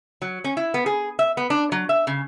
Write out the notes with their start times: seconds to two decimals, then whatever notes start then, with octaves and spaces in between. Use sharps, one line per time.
0.22 F#3
0.44 C#4
0.57 E4
0.74 B3
0.86 G#4
1.19 E5
1.37 B3
1.50 D4
1.72 F#3
1.89 E5
2.07 C#3